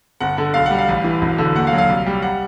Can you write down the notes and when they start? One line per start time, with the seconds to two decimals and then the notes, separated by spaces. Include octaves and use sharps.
0.20 G1 F#5
0.37 D3 F#5
0.54 B1 F5
0.66 G3 F#5
0.78 F5
0.89 A1
1.04 E3
1.22 E1
1.38 D3
1.55 D#2 F#5
1.67 F5
1.73 F#3
1.78 F5
1.89 C2
2.06 G3
2.22 F#5